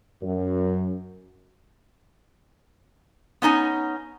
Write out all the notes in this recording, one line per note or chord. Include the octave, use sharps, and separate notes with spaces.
F#2
B3 C#4 D#4 G#5